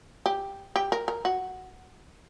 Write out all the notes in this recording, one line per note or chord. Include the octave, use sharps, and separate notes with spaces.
G4
G4
A#4
A#4
F#4